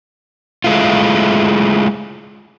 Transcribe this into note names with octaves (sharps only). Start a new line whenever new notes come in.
G#3 A3 E4 F4